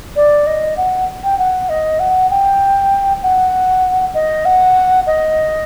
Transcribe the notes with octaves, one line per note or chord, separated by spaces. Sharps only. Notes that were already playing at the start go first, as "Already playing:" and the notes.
D5
D#5
F#5
G5
F#5
D#5
F#5
G5
F#5
D#5
F#5
D#5